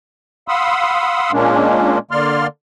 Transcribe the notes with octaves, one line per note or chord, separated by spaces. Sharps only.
F5 F#5 B5 C6 D#6 E6
A#2 G#3 A#3 C#4 D4
D3 A#3 D5 C6 F6